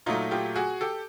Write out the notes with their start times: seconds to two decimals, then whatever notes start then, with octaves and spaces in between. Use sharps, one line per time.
0.06 A#2 F#3 A3 D#4 F4
0.31 F4 G4
0.56 F#4 G#4
0.81 G4 A4